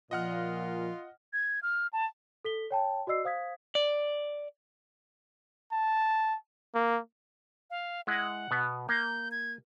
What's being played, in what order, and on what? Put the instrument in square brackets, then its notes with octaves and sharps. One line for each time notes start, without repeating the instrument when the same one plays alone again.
[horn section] A#2 [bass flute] F3 [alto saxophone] F4 [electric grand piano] D#5 F#5 F6
[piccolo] G#6
F6
A5
[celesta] A4 B6 G7
C#5 G5 A5
F#4 D5 D#5 E6 C7
C5 F5 D#6 G#6 B6
[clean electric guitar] D5
[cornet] A5
A#3
[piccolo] F5
[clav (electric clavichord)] G#3 E4 D#5 [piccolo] F#5
[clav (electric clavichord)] B2 B3
[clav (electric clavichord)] A#3 [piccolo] G6
[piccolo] G#6